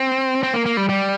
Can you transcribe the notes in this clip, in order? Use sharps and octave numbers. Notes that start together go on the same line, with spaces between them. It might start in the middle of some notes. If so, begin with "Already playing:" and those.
Already playing: C4
C4
A#3
A#3
G3
G3